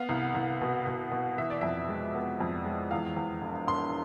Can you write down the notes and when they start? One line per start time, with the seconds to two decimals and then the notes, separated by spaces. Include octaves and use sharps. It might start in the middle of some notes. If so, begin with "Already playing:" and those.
Already playing: B3 F5
0.09 C2
0.35 C2
0.61 B2
0.87 B2
1.11 B2
1.37 E3 E5
1.50 D5
1.61 F2 E5
1.89 G#3
2.14 B3
2.40 F2
2.65 G#3
2.91 E2 F5
3.16 E2
3.42 E1
3.68 E1 C6